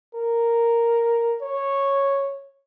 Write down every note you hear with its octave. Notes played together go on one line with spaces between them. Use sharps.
A#4
C#5